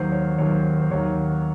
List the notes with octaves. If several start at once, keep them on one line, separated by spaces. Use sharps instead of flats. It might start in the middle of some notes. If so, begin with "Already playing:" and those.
Already playing: D#2 D#3 F#3 C5
C#5
D#2 D#3 F#3 C#5
C5
C5
D#2 D#3 F#3 C#5